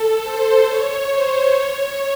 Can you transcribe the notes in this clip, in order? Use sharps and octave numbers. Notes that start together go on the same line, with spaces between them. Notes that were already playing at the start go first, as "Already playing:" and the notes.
Already playing: A4
C5
C#5
C5
C#5